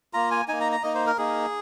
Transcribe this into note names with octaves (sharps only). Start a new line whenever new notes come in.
A#3 F4 A#5
G#5
A#3 D#4 G#5
A#5
A#5
A#3 D#4 D#5
C5
A#4
A#3 D#4 G#4